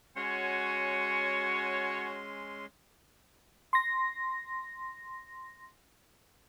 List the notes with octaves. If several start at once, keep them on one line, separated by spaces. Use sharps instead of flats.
G#3 C#4 F#4 C#5 G#5 C6 C#7
C6 A#6